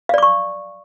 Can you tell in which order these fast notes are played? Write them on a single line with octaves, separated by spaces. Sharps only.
F5 D5 D6 C#6